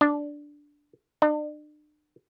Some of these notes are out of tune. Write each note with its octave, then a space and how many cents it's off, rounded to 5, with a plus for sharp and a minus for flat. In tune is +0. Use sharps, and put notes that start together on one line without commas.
D4 -5
D4 +40